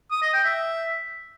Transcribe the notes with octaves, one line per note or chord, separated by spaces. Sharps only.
D#6
D#5
G5
E5